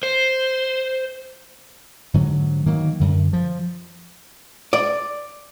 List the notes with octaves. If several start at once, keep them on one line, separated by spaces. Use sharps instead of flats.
C5
G#2 D3 F#3
D#3 F#3 A#3
F#2 D3
F3
D5